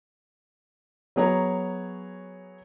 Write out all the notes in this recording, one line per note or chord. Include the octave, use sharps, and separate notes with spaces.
F#3 B3 G#4 C#5 A#5